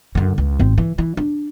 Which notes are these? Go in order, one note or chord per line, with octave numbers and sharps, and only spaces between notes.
F#2 D3
C#2
G#1 C4
E3
E3
D4